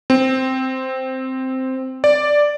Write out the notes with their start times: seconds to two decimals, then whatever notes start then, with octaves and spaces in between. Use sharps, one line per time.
0.10 C4
2.04 D5